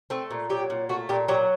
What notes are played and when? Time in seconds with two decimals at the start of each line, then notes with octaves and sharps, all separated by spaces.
0.10 A3 C4
0.31 A#2
0.50 F#3 G4
0.70 A#2
0.89 A3 F#4
1.09 A#2 G4
1.28 F#3 G4